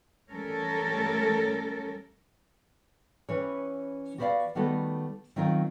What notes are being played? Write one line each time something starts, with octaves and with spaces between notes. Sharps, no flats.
E3 G3 A3 C#4 A4 A#4
E3 C#4 G4 B4 C#5
F#4 G4 B4 C5 D5 F5
D#3 G3 A3 B3 F#4 A4
D#3 F#3 C4 F4 A#4